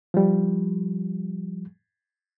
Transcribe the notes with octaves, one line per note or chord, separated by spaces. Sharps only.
F3 G3